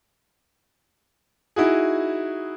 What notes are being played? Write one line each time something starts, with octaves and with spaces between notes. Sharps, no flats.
D#4 E4 F#4 G#4